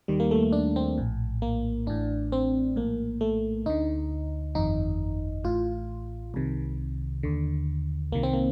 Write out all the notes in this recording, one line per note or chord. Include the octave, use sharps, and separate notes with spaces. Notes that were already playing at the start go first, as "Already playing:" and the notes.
D#2 D#3 G3
A#3
A3
D4
C4
A#1 A2
A#3
A1 A2 D4
C4
A#1 A2 A#3
A3
D2 D3 D#4
G1 F2 D#3 D#4
A1 A2 F4
C2 C3 D#3
D#2 D3
C2 C3 D#3 A#3
C4
A#3